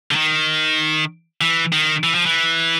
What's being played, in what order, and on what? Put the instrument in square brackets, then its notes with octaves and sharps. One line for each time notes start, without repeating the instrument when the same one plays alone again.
[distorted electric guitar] D3
D#3
E3
D#3
E3
F3
E3